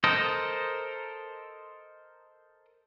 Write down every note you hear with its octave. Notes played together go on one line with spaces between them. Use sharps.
A4 A#4 C5 D#5